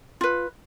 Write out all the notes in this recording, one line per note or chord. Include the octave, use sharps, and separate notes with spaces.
F4 B4